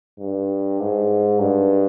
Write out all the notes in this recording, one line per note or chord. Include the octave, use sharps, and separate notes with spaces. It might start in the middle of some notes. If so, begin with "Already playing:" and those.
G2
G#2
G2